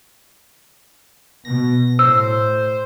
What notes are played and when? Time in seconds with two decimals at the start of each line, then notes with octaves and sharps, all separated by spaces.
1.45 B2 A#6
1.99 A2 C5 E6